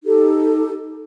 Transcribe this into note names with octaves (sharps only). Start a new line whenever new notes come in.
D#4 G4 A4